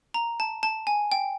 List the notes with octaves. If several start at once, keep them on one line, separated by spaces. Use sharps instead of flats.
A#5
A5
A5
G#5
G5